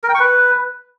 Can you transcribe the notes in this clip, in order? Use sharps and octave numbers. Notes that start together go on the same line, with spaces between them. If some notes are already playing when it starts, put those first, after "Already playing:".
A#4
G5
C#6
B4